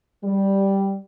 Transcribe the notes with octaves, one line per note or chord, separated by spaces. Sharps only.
G3